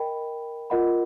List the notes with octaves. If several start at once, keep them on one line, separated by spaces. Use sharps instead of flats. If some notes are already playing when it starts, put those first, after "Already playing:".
Already playing: A#4 D#5 G5 B5
F4 A#4 D#5 F#5 B5